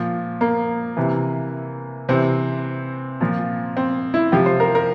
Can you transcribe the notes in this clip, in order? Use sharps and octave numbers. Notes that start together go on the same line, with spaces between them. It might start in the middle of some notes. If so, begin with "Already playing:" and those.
Already playing: A#2 F3
A#3
C3 E3
C3 E3 C4
A#2 F3
C4
E4
C3 F3 G4
C5
A#4
A#4